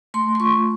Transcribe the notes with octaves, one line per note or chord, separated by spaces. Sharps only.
A3 C6
C6
F4 C#6